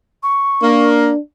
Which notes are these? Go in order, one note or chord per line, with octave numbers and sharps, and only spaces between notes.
C#6
A#3 D4